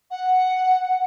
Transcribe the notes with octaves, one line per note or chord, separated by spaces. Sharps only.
F#5